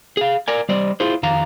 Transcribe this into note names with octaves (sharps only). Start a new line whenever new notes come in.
G#4 F5
A#4 D5 G#5
G3 C5 D5 D#5
E4 F4 G#4 C5
F2 D#3 F5 A#5